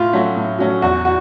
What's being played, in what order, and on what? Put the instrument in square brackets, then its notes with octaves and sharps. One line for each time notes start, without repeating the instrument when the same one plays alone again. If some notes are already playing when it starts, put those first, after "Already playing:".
Already playing: [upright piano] A2 [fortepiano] F4
[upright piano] F#3 A3 C#4 F#4
A2
F#3 A3 C#4 F#4
[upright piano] E2 [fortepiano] F#4
[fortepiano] F#4